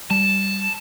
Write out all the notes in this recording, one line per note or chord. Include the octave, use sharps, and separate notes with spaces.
G3 A5